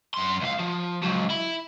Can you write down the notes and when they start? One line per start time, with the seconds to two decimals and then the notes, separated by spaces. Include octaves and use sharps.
0.14 F#2 C6
0.42 C#2 F5
0.59 F3
1.03 C#2 F#3
1.30 E4